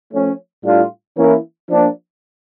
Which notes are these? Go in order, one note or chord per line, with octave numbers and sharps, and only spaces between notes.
F3 A3 C#4
A2 G3 D4 F4
E3 A#3 C#4 E4 A#4
F3 A#3 D4